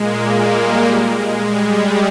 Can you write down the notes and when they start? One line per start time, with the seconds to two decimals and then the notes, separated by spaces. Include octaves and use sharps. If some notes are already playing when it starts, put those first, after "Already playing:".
Already playing: A#2 G#3 A#3
0.22 A#2 A#3
0.53 G3
1.16 G#3
1.47 G3